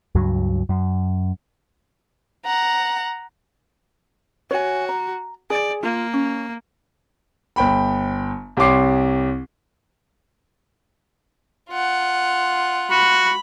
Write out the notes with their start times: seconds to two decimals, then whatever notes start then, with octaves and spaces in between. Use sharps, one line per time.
0.15 C#2 G2 F#3
0.69 F#2
2.45 F#5 A#5
4.51 F#4 C#5 G#5
4.89 A#5
5.50 G#4 D5
5.83 A#3 F4
6.13 C#4
7.56 G1 G5 B5
8.57 C2 G4 C#5 C6 D6 C7
11.70 F4 F#5
12.91 F#4 B5